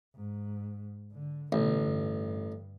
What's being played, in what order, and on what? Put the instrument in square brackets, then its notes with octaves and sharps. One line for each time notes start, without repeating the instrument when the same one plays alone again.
[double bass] G#2
D3
[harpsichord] A1 [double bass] B2 D3
[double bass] G2